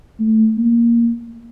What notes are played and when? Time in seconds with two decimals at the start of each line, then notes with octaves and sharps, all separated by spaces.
0.20 A3
0.57 A#3